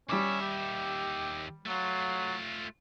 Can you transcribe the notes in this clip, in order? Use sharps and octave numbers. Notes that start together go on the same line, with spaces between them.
D#2 G3 C#4 E5 D6
G4
F#3 A3 F4